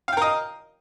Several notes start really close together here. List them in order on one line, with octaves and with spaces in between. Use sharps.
F5 G5 A#4 D#5